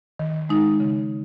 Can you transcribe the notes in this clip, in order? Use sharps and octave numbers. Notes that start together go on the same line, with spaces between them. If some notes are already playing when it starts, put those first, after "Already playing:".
D#3
G#3 D#4
C#3